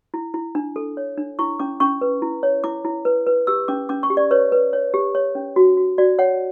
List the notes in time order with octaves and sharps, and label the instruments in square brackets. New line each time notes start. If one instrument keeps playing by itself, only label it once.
[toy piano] E4
E4
D4
A4
C#5
D4
E4 C#6
C#4 D6
C#4 C#6
B4
E4
C#5
E4 D6
E4
B4
B4
G4 E6
C#4 D6
C#4 D6
C#6
G4
D5
B4 C#5
B4
C#5
G4
C#5
C#4
F#4
F#4
F#4 D5
C#5 F#5